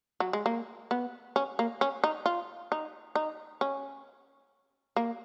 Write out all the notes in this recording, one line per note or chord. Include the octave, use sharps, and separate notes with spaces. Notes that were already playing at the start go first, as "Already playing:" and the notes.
F#3
G#3
A#3
B3
C#4
A#3
C#4
D#4
F4
D#4
D#4
C#4
A#3